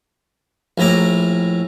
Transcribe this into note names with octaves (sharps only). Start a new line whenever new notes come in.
A#1 A2 E4 A#5 D6